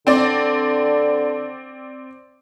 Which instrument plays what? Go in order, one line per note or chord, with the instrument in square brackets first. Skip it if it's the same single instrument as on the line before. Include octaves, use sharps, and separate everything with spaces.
[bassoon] D3 [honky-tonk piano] C4 D5